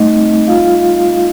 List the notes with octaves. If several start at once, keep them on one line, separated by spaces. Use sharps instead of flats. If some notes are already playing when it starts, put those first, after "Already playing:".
Already playing: G3 A3 D#4 D#5
C4
G3 F4 F5
G3